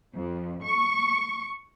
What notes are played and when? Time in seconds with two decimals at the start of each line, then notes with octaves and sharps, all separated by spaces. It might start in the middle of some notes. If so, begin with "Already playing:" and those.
0.15 F2
0.64 C#6